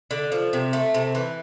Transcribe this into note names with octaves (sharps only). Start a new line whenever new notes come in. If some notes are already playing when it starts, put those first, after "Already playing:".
D3
F3
C3
A3
C3
E3